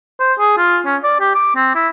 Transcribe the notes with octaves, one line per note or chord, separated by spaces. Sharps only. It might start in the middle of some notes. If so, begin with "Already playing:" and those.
C5
G#4
F4
C#4
D5
G4
D6
C4
E4